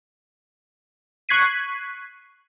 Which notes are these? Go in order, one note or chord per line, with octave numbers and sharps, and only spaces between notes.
C#6 F#6 G#6 B6 C7 D#7